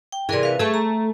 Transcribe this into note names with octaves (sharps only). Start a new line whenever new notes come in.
G5
C3 E3 G#4 A#4 D5
B4 F5
A3 G#4 A4 C#6
A#5